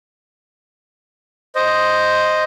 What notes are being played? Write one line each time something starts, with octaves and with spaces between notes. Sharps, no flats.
C5 D#5